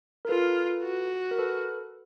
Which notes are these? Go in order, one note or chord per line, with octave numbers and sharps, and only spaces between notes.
A#4
F4 A4 B4
F#4
A#4
A4 B4